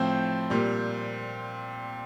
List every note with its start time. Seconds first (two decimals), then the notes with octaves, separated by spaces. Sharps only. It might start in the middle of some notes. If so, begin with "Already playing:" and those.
Already playing: A2 F3 C4 C5
0.50 A#2 G3